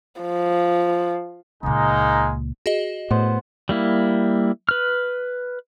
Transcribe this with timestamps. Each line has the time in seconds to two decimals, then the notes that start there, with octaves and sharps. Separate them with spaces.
0.21 F3
1.63 C#2 A#2 G#3 A#3 D#4
2.66 F#4 G#4 D#5
3.11 A2 B3 C5
3.69 G3 A#3 E4
4.69 B4 F6